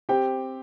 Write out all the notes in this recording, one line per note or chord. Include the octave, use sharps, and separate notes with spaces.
C4 G4 G5